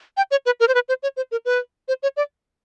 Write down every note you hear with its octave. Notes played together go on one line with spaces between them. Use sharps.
G5
C#5
B4
A#4
C5
B4
C5
C#5
C5
A#4
B4
C5
C#5
D5